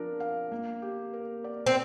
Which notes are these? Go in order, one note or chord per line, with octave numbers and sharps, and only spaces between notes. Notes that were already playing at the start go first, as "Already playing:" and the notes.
Already playing: F3 D4 A#4
F5
A#3
G4
A#4
D5
C4